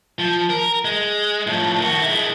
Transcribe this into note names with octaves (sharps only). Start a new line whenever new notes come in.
F3
A#4
G#3
A2 F3
D#3 F#4
G#3 E4